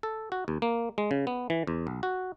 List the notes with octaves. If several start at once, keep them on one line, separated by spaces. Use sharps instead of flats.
A4
F#4
D#2
A#3
G#3
C#3
B3
E3
E2
B1
F#4